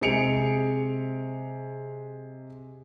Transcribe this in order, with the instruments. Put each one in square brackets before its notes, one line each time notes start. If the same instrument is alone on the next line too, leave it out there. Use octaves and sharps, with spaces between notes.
[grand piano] C3 G#3 G#4 C#7 D7 F7